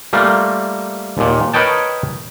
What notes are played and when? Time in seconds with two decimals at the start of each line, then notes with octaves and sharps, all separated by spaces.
0.13 G3 A3 A#3 F4
1.18 D#2 A#2
1.54 A#4 B4 C#5 D#5 G5 A5